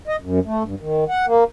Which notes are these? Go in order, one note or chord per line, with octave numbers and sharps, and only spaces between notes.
D#5
F#2
A3
G2
D#3
F#5
A#3